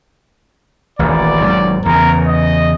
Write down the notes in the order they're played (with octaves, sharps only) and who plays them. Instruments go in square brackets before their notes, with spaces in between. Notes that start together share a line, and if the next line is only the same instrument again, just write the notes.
[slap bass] D#1 A1 [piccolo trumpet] D5
[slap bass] D#1 G#2 F#3
[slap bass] E2 C#3 [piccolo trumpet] A#4
[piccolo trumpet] D#5